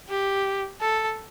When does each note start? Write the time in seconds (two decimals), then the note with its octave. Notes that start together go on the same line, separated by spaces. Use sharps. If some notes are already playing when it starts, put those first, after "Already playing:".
0.09 G4
0.81 A4